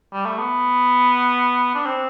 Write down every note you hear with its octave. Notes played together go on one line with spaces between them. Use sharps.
G3
A3
B3
D4
C4